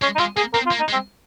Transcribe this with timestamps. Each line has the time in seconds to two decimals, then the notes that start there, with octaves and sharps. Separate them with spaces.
0.02 G#3 C#4
0.15 D#4
0.19 G#3 F4
0.36 A#3 G#4
0.53 C4 A#4
0.66 F4
0.72 A#3
0.80 D#4
0.89 G#3
0.93 C4